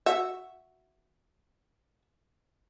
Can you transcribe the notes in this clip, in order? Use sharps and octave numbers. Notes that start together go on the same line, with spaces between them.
F#4 E5